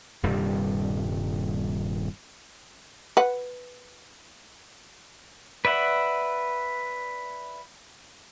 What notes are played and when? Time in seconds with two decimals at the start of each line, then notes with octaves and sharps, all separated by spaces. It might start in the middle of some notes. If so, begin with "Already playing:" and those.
0.23 D#1 G2 C3 G3
3.17 B4 F#5
5.65 B4 D5 E5 F#5